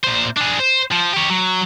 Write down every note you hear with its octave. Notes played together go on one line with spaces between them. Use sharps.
A#2 C5
D4 G#4
C5
F3
G4 C#5
F#3